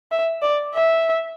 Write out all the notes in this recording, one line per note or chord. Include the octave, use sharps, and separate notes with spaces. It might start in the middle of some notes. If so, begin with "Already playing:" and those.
E5
D5
E5